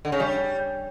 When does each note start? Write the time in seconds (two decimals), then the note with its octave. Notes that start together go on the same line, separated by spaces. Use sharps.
0.05 D3
0.12 C#3
0.20 G3